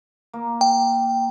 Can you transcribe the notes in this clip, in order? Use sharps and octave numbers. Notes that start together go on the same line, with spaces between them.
A#3
G5